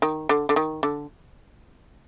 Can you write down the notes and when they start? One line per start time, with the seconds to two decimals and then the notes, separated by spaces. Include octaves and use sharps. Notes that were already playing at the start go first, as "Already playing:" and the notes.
0.02 D#3
0.29 D3
0.49 D3
0.56 D#3
0.83 D3